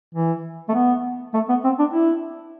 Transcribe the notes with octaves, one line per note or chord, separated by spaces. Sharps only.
E3
A3
B3
A3
B3
C4
D4
E4